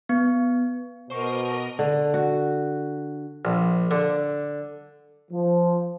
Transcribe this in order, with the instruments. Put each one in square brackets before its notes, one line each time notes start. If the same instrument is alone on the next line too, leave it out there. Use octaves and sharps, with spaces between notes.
[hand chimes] B3
[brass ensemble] B2 [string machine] A#4 D#5 [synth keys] C5 C#6 D6
[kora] D3
F#4
[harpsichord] A#1
D3
[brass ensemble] F3